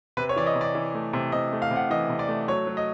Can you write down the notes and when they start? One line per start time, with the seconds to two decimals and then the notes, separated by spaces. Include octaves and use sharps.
0.17 C3 B4
0.29 C#5
0.36 E3 D5
0.47 D#5
0.55 C3
0.61 D5
0.75 E3
0.95 A3
1.13 C3
1.32 C3 D#5
1.53 A3
1.62 F5
1.71 C3 F#5
1.90 E3 D#5
2.10 C3
2.19 D5
2.28 A3
2.48 F#3 C#5
2.67 F#3
2.77 D#5